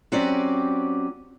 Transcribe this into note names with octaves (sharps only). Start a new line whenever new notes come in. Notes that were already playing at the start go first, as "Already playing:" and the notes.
F#3 C4 C#4 F#4 G4 D5